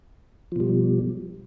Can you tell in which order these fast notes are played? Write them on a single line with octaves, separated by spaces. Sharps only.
F3 B2 G3